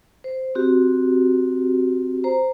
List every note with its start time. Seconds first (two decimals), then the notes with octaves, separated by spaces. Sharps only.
0.24 C5
0.55 C4 F#4 G4
2.24 C5 A#5